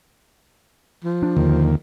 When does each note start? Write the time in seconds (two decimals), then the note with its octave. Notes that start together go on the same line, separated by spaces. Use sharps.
1.05 F3
1.23 D4
1.37 D#2 D3